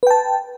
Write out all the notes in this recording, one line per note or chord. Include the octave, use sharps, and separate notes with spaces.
B4 G5 A5